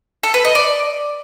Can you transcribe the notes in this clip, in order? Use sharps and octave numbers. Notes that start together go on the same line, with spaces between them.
A4
B4
D#5
D5